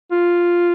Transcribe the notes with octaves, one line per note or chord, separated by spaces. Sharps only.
F4